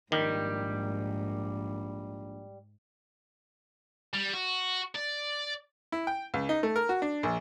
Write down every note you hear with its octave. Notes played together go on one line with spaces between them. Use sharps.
A#1 G#2 D#3 G3
G3
F#4
D5
E4
G5
C#2
D#4
A3
A#4
F#4
D4
A#1